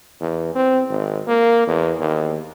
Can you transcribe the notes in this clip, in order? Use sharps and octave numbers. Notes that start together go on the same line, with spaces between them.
E2
C4
G#1
A#3
E2
D#2